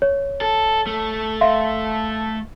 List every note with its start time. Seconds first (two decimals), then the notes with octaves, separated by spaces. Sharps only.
0.02 C#5
0.41 A4
0.87 A3
1.41 E5 F5 C6